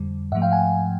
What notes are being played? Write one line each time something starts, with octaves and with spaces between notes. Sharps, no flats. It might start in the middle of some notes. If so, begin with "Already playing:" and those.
Already playing: F2 D3 G3
G#2 F3 A3 E5 F#5
F5 G5
F#5 G#5